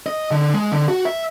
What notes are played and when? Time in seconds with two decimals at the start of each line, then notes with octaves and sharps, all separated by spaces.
0.06 D#5
0.31 D3
0.54 G#3
0.72 D3
0.88 F#4
1.05 E5